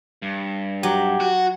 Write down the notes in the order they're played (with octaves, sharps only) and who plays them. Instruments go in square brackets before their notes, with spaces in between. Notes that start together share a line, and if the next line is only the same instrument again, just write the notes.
[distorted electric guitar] G2
[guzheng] F#3 [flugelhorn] G4
[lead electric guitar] F#4